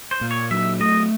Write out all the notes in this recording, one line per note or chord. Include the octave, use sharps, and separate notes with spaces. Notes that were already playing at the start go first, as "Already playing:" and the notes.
C5
A#2
C#5
F#3 E5
A3 D#5